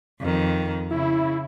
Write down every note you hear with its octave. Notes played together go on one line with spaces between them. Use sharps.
F2 D#3
C#3 E4